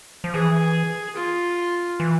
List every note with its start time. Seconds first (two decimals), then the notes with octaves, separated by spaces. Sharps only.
0.24 F3
0.34 E3 G#4
1.17 F4
2.00 E3